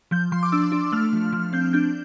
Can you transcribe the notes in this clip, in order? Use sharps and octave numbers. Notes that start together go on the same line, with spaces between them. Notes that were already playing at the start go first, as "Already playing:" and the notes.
F3 G6
F3 C6
D6
D4 E6
D4
A3 F6
F3
F3 F6
C4 G6
D4 G6